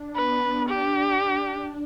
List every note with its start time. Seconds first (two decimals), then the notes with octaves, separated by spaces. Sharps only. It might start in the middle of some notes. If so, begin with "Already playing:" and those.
Already playing: D4
0.15 B3 B4
0.67 D4 G4